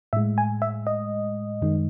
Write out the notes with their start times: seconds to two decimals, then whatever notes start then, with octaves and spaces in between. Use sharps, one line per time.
0.13 A2 G#3 E5
0.38 G#5
0.62 E5
0.87 D#5
1.62 F#2 D#3 G#3